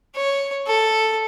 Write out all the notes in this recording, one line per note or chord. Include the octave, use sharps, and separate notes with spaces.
C#5
A4